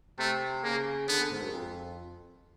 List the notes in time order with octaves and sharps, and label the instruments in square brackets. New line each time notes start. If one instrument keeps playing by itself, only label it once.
[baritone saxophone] C3 [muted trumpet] A3
[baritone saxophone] C#3 [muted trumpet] A#3
[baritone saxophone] D3 [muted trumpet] B3
[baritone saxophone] D3
G#2
F#2
F2